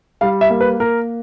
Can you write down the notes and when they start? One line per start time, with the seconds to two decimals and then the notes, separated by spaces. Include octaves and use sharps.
0.21 G3 F5
0.41 E5
0.50 A#3
0.61 B4
0.80 A#3 A#4